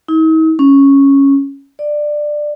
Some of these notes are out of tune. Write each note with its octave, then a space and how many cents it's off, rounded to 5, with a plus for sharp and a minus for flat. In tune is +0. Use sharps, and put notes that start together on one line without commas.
D#4 +45
C#4 -5
D5 +15